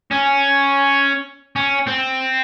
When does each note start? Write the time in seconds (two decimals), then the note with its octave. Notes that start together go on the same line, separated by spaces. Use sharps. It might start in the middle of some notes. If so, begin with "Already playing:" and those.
0.11 C#4
1.56 C#4
1.87 C4